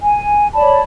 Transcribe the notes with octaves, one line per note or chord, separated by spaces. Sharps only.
G#5
C#5 D5 A5 B5